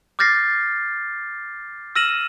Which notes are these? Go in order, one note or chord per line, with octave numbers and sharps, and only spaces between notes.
D6 F6 G6 A6 A#6 C7
E6 F6 A#6 D#7 E7 F#7